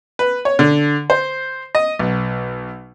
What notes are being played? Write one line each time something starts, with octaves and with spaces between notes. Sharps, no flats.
B4
C#5
D3
C5
D#5
B1